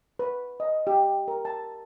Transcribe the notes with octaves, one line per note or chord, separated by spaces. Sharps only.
B4
D#5
G4
A#4
A5